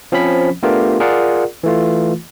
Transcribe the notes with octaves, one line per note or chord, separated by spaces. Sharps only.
F3 C4 C#4 B5 B6
A3 B3 D4 F4 G4 A#4
F4 G#4 A#4 D5 F#5
E3 A3 F4